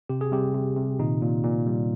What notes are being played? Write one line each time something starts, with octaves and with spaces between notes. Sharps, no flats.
C3 G4
G#4
C3 G3 G4
C3
C3
A#2 D#3 D#4
A#2
A#2
G3